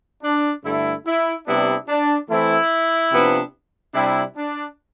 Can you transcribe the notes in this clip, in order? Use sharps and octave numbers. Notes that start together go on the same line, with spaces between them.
D4
G2 D3 A3 E4
E4
C3 G3 B3 D4 E4
D4
E3 A3 C4 E4
C3 F3 B3 D4
C3 G3 D4 E4
D4